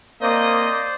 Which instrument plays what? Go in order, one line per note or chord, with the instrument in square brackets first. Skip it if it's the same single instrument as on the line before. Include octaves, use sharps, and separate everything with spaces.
[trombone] A#3 [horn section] C4 D#5 [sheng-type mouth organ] C5 D5